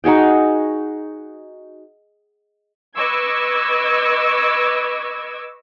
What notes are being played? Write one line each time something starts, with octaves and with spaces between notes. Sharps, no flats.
D#4 F#4 G#4 G5
B4 D#5 C#6 D6 E6 G#6